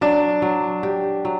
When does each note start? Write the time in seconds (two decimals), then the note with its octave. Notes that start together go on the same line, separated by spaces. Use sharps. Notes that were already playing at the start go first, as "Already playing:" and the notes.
0.01 F#3 D4
0.42 F#3
0.83 G4
1.25 F#3